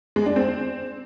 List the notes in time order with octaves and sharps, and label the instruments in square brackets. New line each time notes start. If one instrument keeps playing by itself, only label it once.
[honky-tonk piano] G#3
D4
C4